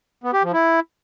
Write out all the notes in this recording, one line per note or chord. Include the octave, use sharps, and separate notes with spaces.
B3
G4
F3
E4